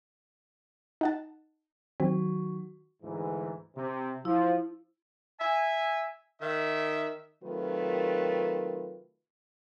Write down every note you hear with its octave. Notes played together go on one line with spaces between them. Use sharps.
D#4 F#5 A5
D#3 F#3 C4 F#4
D2 G#2 E3
C3
F3 E4
E5 G#5
D#3 E5
C3 D#3 F#3 A3 F4 B4